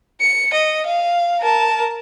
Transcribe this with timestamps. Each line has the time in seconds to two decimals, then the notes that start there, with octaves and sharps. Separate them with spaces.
0.21 C#7
0.53 D#5
0.86 F5
1.41 A#4 A5